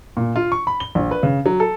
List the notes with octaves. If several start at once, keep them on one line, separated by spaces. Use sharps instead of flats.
A#2
F4
C#6
B5
G7
A#1
B4
C#3
F#3
A4